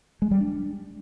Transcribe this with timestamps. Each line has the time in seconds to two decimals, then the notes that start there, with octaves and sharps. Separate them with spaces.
0.22 G#3
0.31 G3
0.41 D4